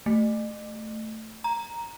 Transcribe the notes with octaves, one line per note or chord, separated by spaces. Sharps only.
A3
A#5